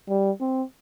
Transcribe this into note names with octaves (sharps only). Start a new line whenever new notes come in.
G3
C4